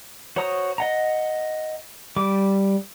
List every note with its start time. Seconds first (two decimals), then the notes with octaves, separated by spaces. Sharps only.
0.36 F#4 C5 C#5 A#5 D#6
0.78 D#5 F#5 A#5
2.16 G3 D6